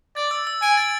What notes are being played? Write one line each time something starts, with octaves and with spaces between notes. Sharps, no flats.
D5 A6
E6
E6
G#5 D7
A6